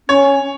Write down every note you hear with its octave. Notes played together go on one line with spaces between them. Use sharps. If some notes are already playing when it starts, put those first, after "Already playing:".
C#4 C#5